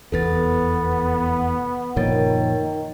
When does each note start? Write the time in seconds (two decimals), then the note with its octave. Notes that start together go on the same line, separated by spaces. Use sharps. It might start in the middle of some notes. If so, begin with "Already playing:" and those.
0.12 F1 E2 B3 A4 B4 A6
1.97 F#1 A#2 D#3 F3 A#4 C#5 A6